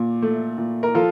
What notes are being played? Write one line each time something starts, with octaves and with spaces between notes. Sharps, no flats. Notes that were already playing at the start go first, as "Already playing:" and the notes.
Already playing: A#2
A3
A#2
A#4
F3 F4 A4